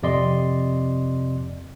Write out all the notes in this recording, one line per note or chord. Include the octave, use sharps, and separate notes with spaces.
F2 C3 D5 D#5 C6